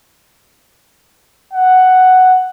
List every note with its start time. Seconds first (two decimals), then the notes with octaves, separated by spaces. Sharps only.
1.53 F#5